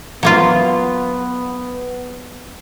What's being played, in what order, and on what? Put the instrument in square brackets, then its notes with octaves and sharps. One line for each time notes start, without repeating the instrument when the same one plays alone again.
[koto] F#3 A#3 F4 [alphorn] B3